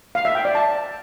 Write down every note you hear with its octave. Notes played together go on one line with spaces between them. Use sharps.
F5
E5
G5
D5
A5